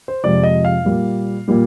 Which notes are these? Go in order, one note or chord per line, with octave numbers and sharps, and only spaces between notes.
C5
F2 C3 F3 G#3 D5
D#5
F5
A#2 G3 A#3
A#2 G3 A#3